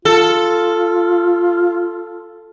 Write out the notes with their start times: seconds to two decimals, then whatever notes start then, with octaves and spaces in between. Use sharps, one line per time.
0.05 F4 A4